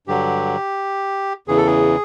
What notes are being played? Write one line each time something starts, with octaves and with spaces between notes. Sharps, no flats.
G2 D3 F#3 G4
E2 C#3 E3 G#4
A4
G#4